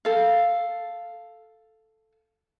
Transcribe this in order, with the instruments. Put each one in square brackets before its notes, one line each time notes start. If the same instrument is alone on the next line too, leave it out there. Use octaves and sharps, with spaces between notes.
[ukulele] A4 F5